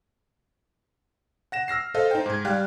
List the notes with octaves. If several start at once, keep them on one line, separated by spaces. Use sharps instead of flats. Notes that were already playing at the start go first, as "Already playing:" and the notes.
F#5 A#6 E7
E6 F6 A#6 C7
A4 C5 D#5 F5
D#4 C5 G5
G#2 G#6
G3 F5 G5 F#6